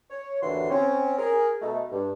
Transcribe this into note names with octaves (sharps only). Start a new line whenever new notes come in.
C#5
D#2 A2 D3 E3 F#4 C6
C4 C#4
G#4 A#4
B2 A3 D#4
G2